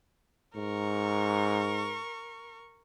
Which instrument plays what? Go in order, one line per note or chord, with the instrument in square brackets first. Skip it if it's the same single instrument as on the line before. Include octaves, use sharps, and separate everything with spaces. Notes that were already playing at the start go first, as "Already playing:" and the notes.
[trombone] G#2 [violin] A#4 C#6